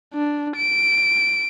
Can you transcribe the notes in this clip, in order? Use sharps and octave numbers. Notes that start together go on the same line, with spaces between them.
D4
D7